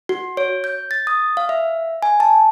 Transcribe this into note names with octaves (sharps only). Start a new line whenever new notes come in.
F#4
C#5
G6
A6
D#6
F5
E5
G#5
A5